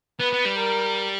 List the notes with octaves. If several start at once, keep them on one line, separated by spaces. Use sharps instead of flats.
B3 B4
B3
G3
A#4